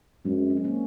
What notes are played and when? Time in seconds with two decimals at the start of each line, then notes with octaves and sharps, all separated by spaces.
0.25 F#2 G#3 C4
0.50 C#4
0.57 C4
0.64 A#3 C#4